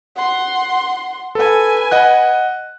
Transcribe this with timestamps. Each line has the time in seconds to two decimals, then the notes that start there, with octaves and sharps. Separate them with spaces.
0.16 F#5 C6
1.35 A4 B4 G#5
1.91 D#5 F#5 F#6